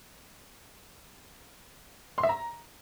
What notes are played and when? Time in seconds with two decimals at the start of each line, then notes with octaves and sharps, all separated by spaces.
2.18 C6
2.23 E5
2.29 A#5